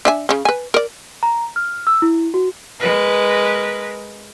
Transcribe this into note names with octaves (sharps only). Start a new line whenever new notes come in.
D4 E5 G#5
C#3 C#4
B4 G#5
A#4 D5
A#5
F6
E6
E4
F#4
G#3 A#4 B4